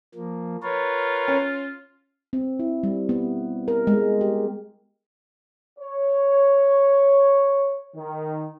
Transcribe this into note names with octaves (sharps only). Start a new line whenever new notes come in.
F3 A#3
F4 A#4 B4 C#5
C#4
C4
E4
G3
B3
A#4
G#3
G4
C#5
D#3